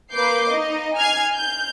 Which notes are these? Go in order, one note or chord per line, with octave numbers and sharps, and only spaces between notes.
A#3 B4 D6 G6 C7
D#4 D#5
G#5 F6 G#6 C7
G6